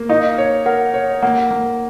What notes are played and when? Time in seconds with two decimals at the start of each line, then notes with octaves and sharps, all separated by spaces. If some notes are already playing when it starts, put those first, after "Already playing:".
Already playing: A#3
0.09 D#4 F5
0.38 C#5
0.66 A#4 F#5
0.94 C#5
1.23 A#3 F#5
1.51 A#3